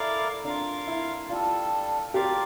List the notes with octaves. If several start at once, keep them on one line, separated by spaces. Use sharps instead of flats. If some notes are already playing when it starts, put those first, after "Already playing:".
Already playing: E4 A4 A#4 D5 F5
D4 F4 A#4 F5
E4
G3 D4 F4 A4
F4 G4 A#4 D5 F5